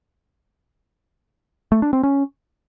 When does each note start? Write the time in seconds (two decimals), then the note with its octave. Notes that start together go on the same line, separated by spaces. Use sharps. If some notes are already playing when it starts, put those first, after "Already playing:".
1.72 A3
1.82 D4
1.93 C4
2.03 C#4